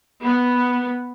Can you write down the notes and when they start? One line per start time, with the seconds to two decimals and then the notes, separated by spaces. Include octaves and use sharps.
0.22 B3